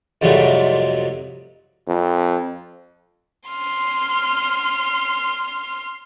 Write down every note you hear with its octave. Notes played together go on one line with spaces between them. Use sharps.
F2 G#2 C3 F#3 G3 A3
F2
C6 F6